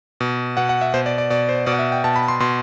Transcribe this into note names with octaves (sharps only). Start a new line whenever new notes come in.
B2
B2 F#5
F#5
E5
B2 C5
D5
D5
B2 D5
C5
B2 D5
F#5
E5
G5
B2 A5
B5
C6
B2 C6